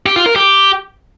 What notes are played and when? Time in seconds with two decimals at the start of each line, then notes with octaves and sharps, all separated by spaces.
0.06 G4
0.16 F4
0.26 A#4
0.36 G4